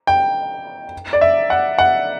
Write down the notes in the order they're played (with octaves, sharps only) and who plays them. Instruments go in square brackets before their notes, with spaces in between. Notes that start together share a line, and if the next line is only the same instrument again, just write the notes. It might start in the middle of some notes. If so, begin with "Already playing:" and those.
[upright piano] G5
D5
E5
F#5
F#5